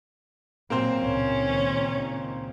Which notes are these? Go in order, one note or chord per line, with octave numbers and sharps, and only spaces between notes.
A#2 F#3 A#3 C4 C5
C#2 A#2 D#3 C#4